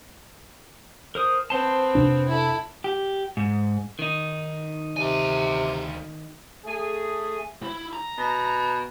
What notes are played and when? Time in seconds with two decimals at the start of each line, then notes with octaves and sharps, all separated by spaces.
1.15 A#4 C5 D#6
1.50 B3 C4 C5 A5
1.95 F2 C3 D4
2.28 E4 A4
2.84 G4
3.37 G#2
3.99 D#3 D#4
4.97 D2 C3 G#5
6.65 A3 G#4
7.63 E4
7.93 A#5
8.18 B2